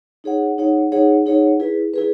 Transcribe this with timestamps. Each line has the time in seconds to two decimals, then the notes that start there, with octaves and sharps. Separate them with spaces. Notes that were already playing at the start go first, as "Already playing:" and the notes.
0.24 D#4 G#4 C#5 F#5
0.58 D#4 G#4 C#5 F#5
0.92 D#4 G#4 C#5 F#5
1.26 D#4 G#4 C#5 F#5
1.60 E4 G#4 B4
1.94 E4 G#4 B4